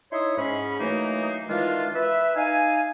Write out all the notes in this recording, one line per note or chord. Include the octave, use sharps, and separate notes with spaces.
D#4 E4 C#5 E5 C6 D#6
G#2 C#4 B5
E3 F#3 A3 A#3 D#4
D#3 E3 G#3 D4 F4
B4 E5
D#4 F5 G#5